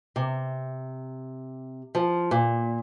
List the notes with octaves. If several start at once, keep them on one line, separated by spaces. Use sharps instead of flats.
C3
F3
A#2